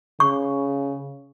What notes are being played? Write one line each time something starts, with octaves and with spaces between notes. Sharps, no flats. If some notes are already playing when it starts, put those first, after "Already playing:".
C#3 C#6